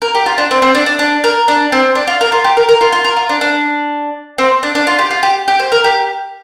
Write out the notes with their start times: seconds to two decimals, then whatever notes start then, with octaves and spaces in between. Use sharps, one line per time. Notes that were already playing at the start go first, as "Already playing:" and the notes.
0.02 A#4
0.15 G4
0.26 F4
0.38 D4
0.51 C4
0.62 C4
0.75 D4
0.86 D4
0.99 D4
1.24 A#4
1.48 D4
1.72 C4
1.95 D4
2.07 F4
2.21 A#4
2.32 F4
2.44 G4
2.57 A#4
2.69 A#4
2.81 F4
2.92 F4
3.04 A#4
3.17 F4
3.29 D4
3.41 D4
4.38 C4
4.63 D4
4.75 D4
4.87 F4
4.99 G4
5.11 F4
5.23 G4
5.48 G4
5.59 C5
5.72 A#4
5.84 G4